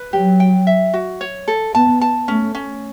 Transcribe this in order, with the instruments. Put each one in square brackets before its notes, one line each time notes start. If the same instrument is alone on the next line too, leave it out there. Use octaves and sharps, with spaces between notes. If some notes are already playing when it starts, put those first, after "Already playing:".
Already playing: [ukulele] B4
[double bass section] F#3 [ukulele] G4
[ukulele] G5
E5
F#4
C#5
A4
[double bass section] B3 [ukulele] A5
[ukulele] A5
[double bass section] A3 [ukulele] C#4
[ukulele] C#4